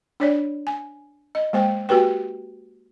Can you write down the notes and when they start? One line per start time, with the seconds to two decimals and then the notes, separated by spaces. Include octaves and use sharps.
0.20 D4 C#5 D5
0.67 G#5
1.35 D#5
1.53 G#3 A#3 C5 G5
1.89 A#3 F#4 G4 B4 G5